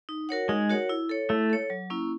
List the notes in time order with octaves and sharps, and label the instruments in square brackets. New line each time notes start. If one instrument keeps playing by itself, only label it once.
[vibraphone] D#4
F#4 A#4 C#5 F#5
[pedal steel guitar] G#3 [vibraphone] D#4
[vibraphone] F#4 A#4 C#5 F#5
E4
A4 C#5
[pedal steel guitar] A3 [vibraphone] E4
[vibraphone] A4 C#5
F#3
A#3 C#4 E4